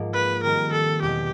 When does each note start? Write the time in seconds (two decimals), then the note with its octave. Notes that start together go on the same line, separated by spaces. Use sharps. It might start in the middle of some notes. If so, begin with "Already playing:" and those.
Already playing: G#2 F3 A#3
0.13 B4
0.43 D#3 G3 C4 A#4
0.72 A4
1.02 E2 B2 F#3 G4